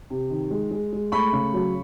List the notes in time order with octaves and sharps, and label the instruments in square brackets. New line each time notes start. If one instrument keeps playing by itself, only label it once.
[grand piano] C3
D#3
G#3
G#3
G#3
A3 B5 C#6
C#3
F#3